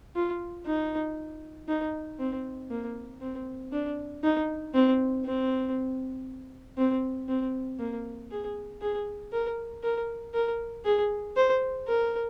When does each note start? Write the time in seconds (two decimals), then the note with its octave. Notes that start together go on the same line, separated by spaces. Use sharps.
0.16 F4
0.66 D#4
1.68 D#4
2.19 C4
2.70 A#3
3.21 C4
3.72 D4
4.23 D#4
4.74 C4
5.25 C4
6.78 C4
7.28 C4
7.79 A#3
8.31 G#4
8.81 G#4
9.32 A#4
9.83 A#4
10.34 A#4
10.85 G#4
11.36 C5
11.87 A#4